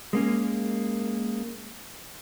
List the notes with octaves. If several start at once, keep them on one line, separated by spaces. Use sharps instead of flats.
G#3 A#3 C#4